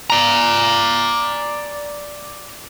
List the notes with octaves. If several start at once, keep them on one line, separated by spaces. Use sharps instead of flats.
D5 A#5